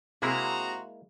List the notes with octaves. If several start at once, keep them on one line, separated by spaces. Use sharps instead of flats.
C3 G#3 A#3 E4 F#4 G#4 C5 A#5